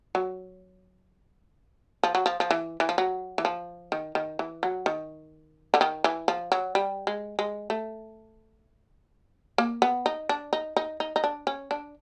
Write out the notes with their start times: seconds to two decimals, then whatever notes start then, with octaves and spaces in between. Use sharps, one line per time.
0.15 F#3
2.03 F3
2.15 F#3
2.26 F3
2.40 F3
2.51 E3
2.80 E3
2.89 F3
2.98 F#3
3.38 E3
3.45 F3
3.92 D#3
4.15 D#3
4.39 E3
4.63 F#3
4.86 D#3
5.74 D3
5.81 D#3
6.04 E3
6.28 F3
6.52 F#3
6.75 G3
7.07 G#3
7.39 G#3
7.70 A3
9.58 A#3
9.82 B3
10.06 D#4
10.29 D4
10.53 D#4
10.77 D#4
11.00 D#4
11.16 D#4
11.24 D4
11.47 C#4
11.71 D4